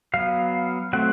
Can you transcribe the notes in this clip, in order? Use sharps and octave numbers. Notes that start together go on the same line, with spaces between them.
F#3 B3 F5
F#3 A3 C4 F#5